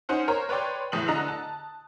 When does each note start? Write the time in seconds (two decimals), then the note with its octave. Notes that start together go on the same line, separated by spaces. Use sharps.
0.09 C#4 D#4 C5 F#5
0.28 A#4 C5 C#5 A#5
0.49 B4 C#5 D5 G5 C6
0.92 F#1 E2 A2 D#6 F#7
1.08 D3 D#5 A#5 F#6 F7
1.28 A5